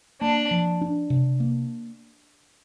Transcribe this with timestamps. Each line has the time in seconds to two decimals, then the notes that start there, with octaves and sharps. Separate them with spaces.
0.21 A#3 D4
0.51 F3
0.81 D4
1.10 C3
1.40 A#3